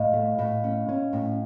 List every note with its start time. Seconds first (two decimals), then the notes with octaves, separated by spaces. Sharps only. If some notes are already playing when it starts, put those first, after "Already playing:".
Already playing: A2 D#5 F5
0.13 A3
0.39 A2
0.64 C#4
0.89 C#4
1.13 A2